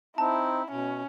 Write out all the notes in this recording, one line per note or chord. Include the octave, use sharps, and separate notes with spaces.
C4 D#4 E4 A5
B2 C#4